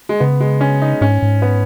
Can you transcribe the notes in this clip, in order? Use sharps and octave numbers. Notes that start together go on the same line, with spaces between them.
G#3
C#3 B3
G#3
C#4
D#4
G#2 C#4
G#2
B3